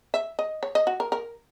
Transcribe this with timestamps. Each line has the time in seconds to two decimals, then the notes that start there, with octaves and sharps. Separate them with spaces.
0.14 E5
0.39 D#5
0.63 C#5
0.75 D#5
0.87 F#4
1.00 A#4
1.12 A#4